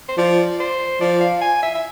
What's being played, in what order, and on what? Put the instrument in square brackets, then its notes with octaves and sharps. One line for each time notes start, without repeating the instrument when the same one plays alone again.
[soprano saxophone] C5
[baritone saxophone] F3 [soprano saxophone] D5
[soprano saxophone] C5
[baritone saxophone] F3 [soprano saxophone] D5
[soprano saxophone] F5
G#5
E5
E5